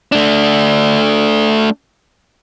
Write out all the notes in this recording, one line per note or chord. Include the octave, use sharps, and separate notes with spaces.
A3 D4